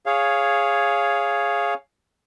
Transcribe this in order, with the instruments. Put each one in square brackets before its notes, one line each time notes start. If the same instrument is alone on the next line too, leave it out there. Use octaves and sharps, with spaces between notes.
[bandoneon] G#4 C#5 F5